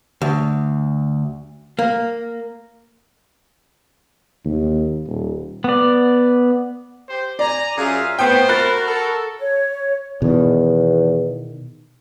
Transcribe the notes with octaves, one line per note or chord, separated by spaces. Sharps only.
D2
A#3
D#2
D#1
B3 D5
G4 C5
D5 G#5 A#5
F#2 C#4 F4 G#4 E5 F5
A2 A3 B3 C5 G5
F#4 A#4 B5 F#6 A6
A4
C#5
E2 B2 D#3